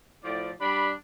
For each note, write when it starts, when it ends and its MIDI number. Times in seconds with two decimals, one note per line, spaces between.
0.25 0.52 45
0.25 0.52 53
0.25 0.52 74
0.61 0.93 55
0.61 0.93 62
0.61 0.93 83